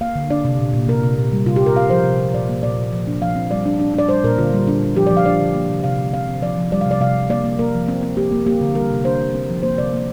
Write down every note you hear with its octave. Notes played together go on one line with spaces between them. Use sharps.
A#3 F5
D3
D4 D5
C3
A#2
A#2
C3 A#4
C3
A#2
G3
C3 F4
G4
C3 A#4
C4 F5
F3 C5
C3
C3
A#2 D5
A#3
A#2 D5
A#2
F3
D4
F3 F5
C4
G3 D5
D4
D4
D4 D5
G3 C5
A#2 A#4
D3 F4
G3
D4
D4
F3 G4
D5
F3
F5
D4 D5
D3
A#3
C3
C3 F5
C3
C4 F5
C4
F3 D5
F3
G3 D5
F5
C3
D5
C3 F5
C3
A#3 D5
A#3
A#3 A#4
F3
C4
C4
A#3 G4
A#3
A#3 G4
D3
G3 A#4
C3
D4 C5
A#3
C4
F3
A#3 C5
C3 D5
A#3